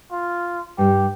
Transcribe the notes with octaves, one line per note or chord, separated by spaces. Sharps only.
F4
G2 G3 G4